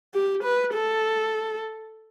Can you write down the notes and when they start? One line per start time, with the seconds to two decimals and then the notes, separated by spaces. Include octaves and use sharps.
0.14 G4
0.44 B4
0.74 A4